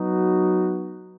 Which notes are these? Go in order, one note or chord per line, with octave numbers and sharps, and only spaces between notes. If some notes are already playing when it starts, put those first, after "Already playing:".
Already playing: F#3 B3 D#4 F#4